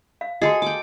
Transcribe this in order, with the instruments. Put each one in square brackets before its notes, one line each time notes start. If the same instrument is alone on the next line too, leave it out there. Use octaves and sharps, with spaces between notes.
[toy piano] F5
[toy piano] F#4 D#5 [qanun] G#4 A4
[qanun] G5 D6 [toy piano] A5